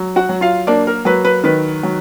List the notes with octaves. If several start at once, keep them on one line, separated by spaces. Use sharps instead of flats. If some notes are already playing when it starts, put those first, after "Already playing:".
Already playing: F#3
F#4 F#5
F#3
F4 F5
A#3 D4 D5
A#4
F#3 B4
B4
D#3 B4
F#3